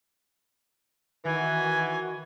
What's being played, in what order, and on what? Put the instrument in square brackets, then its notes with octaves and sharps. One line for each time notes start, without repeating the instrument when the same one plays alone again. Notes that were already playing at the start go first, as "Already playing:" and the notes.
[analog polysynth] D#3 F#4 [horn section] E3 [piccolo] G#5